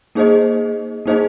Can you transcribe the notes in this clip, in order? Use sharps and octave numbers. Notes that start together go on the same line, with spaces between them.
A#3 D#4 G#4 C5 D#5
A#3 D#4 G#4 C5 D#5